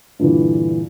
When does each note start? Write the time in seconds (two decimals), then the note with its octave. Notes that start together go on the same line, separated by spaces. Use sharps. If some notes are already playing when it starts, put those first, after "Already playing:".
0.19 G2 A#2 D3 E3